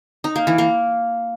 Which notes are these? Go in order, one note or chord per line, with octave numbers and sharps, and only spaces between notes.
D#4
A#3
E3
A#3